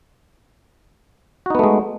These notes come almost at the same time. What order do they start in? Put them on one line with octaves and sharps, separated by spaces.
F#4 D#4 B3 A3 G#3